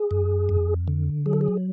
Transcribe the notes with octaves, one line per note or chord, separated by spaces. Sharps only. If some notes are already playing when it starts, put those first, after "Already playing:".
Already playing: G#4
F#2
F2
D3
F#3 G#4
A4
G#4